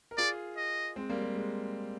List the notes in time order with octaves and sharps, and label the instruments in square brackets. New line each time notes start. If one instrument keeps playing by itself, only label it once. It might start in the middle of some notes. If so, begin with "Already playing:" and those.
[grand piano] A#4
[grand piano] F4 G#4 [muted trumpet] D5
[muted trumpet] D#5
[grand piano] G#3 C4
G3 A#3
G3
G#3